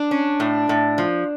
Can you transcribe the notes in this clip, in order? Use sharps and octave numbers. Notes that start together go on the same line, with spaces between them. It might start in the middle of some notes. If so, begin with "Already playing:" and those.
Already playing: D4
C#4
A2
A2
F3